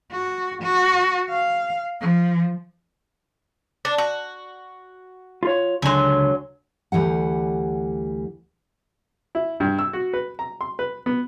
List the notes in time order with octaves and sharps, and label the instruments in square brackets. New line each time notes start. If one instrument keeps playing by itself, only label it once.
[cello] F#4
F#4
F5
F3
[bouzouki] D4
F#4
[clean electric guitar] F4 C#5
[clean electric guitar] C#2 D3 C6 [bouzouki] F#3 G#5
[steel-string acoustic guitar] D2 E3 G3 F#5
[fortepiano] E4
G2
E6
F#4
B4
A#5
C6
B4
B3